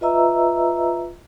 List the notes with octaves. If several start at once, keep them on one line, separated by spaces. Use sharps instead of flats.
F4 B4 D#5 E5 A#5 E6